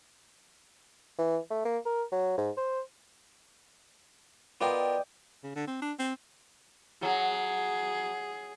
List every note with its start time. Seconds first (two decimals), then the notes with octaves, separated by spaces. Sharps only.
1.18 E3
1.50 A3
1.65 A#3
1.85 A#4
2.12 F#3
2.38 G#2
2.57 C5
4.61 B3 F4 A#4 D5 D#5 G5
5.44 C#3
5.56 D3
5.68 C4
5.82 D4
5.99 C4
7.03 F#3 G#4